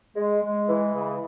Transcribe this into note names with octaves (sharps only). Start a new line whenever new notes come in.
G#3
G#3
E3
C#3